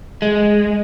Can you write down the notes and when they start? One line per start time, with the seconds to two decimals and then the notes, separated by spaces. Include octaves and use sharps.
0.22 G#3